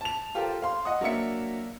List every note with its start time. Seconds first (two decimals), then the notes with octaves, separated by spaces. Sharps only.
0.01 A5 F7
0.35 F4 G4 A4 A#4 C5
0.62 F5 C6
0.85 D#5 F#5 D#6
1.01 F#3 A#3 D4 E5 C#7